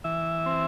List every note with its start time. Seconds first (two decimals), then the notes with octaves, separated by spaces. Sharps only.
0.04 E3 E5
0.46 C4